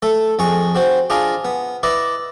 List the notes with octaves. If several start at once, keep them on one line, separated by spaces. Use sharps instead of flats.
A3 A4
F2 G#4 C#6
C4 F#4 C5
D4 F4 G#4 D#5
B3
E4 B4 D5 D#5